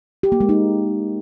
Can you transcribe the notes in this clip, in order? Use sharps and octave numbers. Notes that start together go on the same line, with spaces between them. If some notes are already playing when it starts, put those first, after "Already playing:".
G4
A#3
G#3
D#4